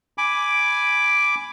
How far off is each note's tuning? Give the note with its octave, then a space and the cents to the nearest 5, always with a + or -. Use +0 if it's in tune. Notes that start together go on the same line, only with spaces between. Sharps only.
G#5 +0 B5 +0 D6 +0